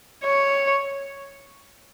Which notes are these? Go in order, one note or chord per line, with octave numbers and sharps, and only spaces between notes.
C#5